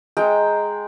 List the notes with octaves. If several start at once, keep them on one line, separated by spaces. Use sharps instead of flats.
G#3 G5 A#5